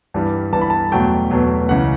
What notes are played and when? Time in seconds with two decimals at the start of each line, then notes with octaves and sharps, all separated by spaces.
0.14 G2 E3 G3 B3
0.52 G2 E3 G3 B3 A5
0.61 B5
0.70 A5
0.92 E2 B2 F#3 A3 G5
1.30 E2 B2 F#3 A3
1.69 C#2 C#3 E3 F#5